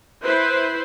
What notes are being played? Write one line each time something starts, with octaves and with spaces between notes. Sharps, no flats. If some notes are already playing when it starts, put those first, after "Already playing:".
E4 B4 C5